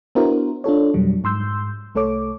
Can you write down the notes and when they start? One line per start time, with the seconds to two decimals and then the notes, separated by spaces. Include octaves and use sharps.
0.15 B3 D4 E4 F#4 A#4 C5
0.64 D4 F4 A4 C#5
0.94 F2 B2 F#3 G3
1.24 G#2 C6 E6 G6
1.95 C2 A3 A4 C#5 D6